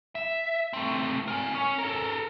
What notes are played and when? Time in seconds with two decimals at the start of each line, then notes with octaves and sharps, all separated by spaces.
0.15 E5
0.73 A3 C4
1.28 A#4 G#5
1.55 C#4
1.79 A4 A#4